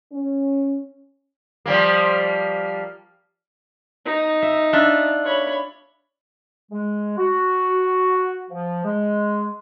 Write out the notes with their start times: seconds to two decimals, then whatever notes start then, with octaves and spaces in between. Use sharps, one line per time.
0.13 C#4
1.66 F3 G3 A#3
4.06 D#4
4.42 E5
4.73 D4 F4 E5
5.25 C#5 B5
6.71 G#3
7.18 F#4
8.51 F3
8.85 G#3